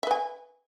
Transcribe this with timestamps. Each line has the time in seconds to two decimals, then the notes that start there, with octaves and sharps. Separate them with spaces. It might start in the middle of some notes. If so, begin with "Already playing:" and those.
0.03 E5
0.07 B4
0.11 G#5